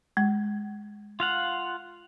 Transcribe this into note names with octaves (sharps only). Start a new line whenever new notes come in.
G#3
F4 F5 F#5